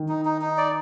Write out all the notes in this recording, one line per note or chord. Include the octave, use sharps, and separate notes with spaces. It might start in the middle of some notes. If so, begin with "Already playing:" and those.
Already playing: D#3
D#4
D#4
D#4
D5